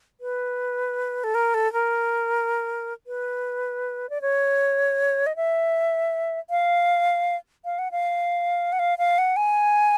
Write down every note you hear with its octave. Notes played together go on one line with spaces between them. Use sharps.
B4
A4
A#4
A4
A#4
B4
D5
C#5
D#5
E5
F5
F5
F#5
F5
F#5
F5
F5
F#5
G#5